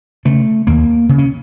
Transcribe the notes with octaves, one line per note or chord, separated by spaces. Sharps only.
C#3 A3
D#2 A#3
C#3
C#4